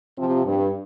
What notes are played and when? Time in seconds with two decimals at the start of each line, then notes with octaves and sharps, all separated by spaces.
0.17 C3 F3
0.44 G2